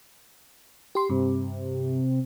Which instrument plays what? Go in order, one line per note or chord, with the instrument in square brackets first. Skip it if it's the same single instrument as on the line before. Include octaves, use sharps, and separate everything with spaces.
[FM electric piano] G4 C6
[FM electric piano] G2 [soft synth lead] C3